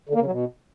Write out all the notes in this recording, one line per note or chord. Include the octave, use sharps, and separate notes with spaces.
D3
A#3
C#3
F#3
B2